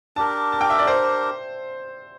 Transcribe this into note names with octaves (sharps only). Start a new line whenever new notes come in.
D4 G4 A#4 A5
A5
G5
E5
D5
C5